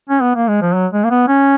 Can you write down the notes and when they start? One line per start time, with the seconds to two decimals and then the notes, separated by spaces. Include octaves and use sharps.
0.10 C#4
0.22 B3
0.36 A#3
0.48 G#3
0.62 F3
0.75 F#3
0.93 G#3
1.05 A#3
1.11 B3
1.28 C#4